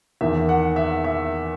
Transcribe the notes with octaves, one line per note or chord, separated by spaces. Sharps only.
E2 D#3 E5
F#5
E5
E5